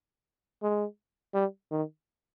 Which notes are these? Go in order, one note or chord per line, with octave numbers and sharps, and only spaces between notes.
G#3
G3
D#3